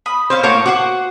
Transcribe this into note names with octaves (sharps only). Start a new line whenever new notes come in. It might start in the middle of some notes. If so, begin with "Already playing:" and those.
B5 D#6
C4 C#4 C5 F5
A2 A#3 F#4 C#5 F5 G6
F#4 C5 F#5 D6